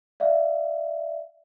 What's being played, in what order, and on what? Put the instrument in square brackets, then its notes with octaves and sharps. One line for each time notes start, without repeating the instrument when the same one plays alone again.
[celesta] D5 E5 F5